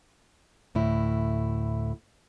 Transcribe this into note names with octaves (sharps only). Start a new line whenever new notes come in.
D2 A2 E4